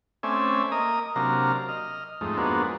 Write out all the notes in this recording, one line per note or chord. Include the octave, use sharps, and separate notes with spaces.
A3 C4 C#4 D5 E5 G#5
A#3 D#5 A#5 D#6
C3 F#3 A#3 D4 F5 A#5
D#5 F6
F2 G#2 A3 D#4
F3 G#3 A#3 B3 D4 F#4